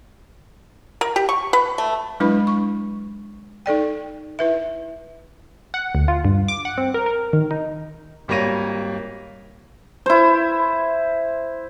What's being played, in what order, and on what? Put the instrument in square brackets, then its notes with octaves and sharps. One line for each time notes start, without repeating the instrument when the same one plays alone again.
[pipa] A#4
G4
C#6
B4
A3
[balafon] F#3 G#3 D4 E4 B4 B5
C#6
D#4 A4 D5 G5
E4 B4 E5
[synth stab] F#5
D2
F4
G2
D6
F#5
C4
A#4
A#4
D#3
D#4
[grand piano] G#1 G3 A#3 C#5 A#6 D#7
[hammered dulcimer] E4 C5